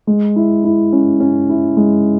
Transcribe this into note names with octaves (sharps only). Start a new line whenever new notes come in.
G#3
E4
E4
C#4
C#4
E4
G#3